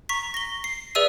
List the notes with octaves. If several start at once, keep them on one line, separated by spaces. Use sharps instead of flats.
A#5 C#6 B6
A#6 G7
C7
G#4 B4 D5 E5 E6 D#7